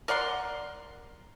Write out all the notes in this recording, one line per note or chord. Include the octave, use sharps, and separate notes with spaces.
A#4 D5 F#5 C6